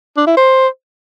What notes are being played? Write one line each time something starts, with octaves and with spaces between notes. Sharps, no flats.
D4
E4
C5